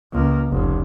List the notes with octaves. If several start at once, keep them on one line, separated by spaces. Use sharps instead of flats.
C#2 A#3
F1 C#2